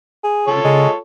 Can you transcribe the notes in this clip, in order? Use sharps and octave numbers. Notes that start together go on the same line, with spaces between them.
G#4
C#3 F4 A4 C#5
C#3 G#3